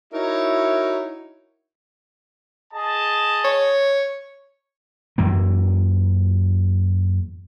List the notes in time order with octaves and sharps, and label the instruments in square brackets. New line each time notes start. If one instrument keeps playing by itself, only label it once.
[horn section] D#4 E4 F#4 A#4 C#5 E5
[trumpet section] G#4 D#5 A5
[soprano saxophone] C#5
[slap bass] F#2 E3 A#3